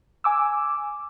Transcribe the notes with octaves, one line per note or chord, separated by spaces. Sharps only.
G#5 D6 E6